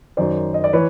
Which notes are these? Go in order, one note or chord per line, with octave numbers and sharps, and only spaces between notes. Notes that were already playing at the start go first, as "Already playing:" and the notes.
F#2 D#3 C5 D5
D#5
D5
E3 B4 C#5